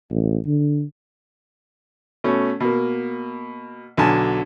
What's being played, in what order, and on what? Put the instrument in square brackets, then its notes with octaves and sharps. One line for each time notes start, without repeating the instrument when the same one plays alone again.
[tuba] A1
D3
[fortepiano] B2 A3 C#4
B2 A#3
B1 D3 F#3 G#5 A5